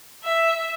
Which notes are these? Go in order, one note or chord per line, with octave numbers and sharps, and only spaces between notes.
E5